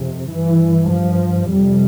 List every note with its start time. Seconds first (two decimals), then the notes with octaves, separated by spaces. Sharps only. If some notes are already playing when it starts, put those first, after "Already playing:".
Already playing: F2 C3
0.31 G2 E3
0.90 F3
1.50 F2 C3 G3